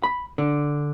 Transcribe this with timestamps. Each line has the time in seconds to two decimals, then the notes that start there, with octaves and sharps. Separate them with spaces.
0.03 B5
0.38 D3